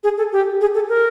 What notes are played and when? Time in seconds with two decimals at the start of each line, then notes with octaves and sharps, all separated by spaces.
0.04 G#4
0.18 A4
0.32 G4
0.61 G#4
0.74 A4
0.89 A#4